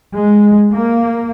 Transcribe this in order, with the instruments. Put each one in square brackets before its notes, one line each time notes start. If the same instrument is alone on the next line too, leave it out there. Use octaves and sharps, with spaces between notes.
[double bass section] G#3
A#3